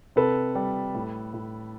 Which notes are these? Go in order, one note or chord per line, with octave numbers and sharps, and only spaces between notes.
C3 A4 B4
G3
A2
A2